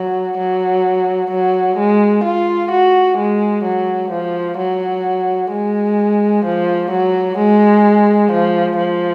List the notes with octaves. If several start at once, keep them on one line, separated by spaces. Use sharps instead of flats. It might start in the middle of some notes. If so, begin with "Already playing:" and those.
Already playing: F#3
F#3
F#3
G#3
F4
F#4
G#3
F#3
F3
F#3
G#3
F3
F#3
G#3
F3
F3